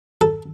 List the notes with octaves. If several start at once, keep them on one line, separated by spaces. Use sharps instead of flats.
A4